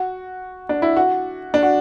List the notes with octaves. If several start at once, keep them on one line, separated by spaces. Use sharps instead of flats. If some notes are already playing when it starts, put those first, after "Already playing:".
Already playing: F#4
D4
E4
F#4
D4
F#4